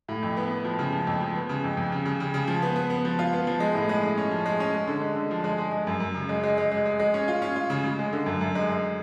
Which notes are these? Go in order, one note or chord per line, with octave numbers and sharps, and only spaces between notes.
A2
F2
B3
B3
F3
C#3
F3
F2
F3
B3
C#3
F2
F2
C#3
C#3
C#3
C#3
F3
B3
B3
B3
F3
F4
B3
F3
G#3
A2
G#3
G#3
C#4
F3
G#3
C#4
G#3
D3
G#3
D3
F3
G#3
G#3
G#3
F#2
F#2
C#3
G#3
G#3
G#3
G#3
G#3
G#3
C#4
F4
C#4
F4
C#3
C#3
G#3
D3
F#2
F#2
G#3
F#2